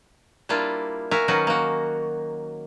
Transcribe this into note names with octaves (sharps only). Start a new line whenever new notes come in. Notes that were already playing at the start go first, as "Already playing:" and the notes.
G3 A#3 D4 E4 F4
F#4 A#4 E5 F5 G#5
D#3 F#3 C#4 D#4 F#4 B4
A#3 F#4